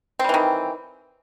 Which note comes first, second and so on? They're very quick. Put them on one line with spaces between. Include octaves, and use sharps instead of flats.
C4 G3 E3 D#3